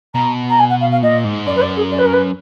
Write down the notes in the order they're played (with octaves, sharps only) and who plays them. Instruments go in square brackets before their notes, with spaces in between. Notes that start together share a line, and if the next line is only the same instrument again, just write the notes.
[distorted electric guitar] B2 [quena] A#5
[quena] A#5
G#5
F#5
F5
F5
[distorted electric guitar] A#2 [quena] D#5
[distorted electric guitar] G#2
[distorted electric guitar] F#2 [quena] D5
[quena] B4
D5
G#4
D5
B4
A#4
B4